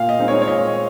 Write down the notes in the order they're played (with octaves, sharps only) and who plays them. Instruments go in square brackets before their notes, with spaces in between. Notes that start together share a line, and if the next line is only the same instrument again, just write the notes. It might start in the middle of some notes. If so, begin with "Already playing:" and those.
Already playing: [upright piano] A#2 F5
D#5
G#3 C4 D#4
C#5
C#5
A#2 D#5